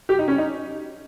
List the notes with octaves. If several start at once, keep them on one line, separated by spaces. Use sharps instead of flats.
G4
D#4
C#4
D#4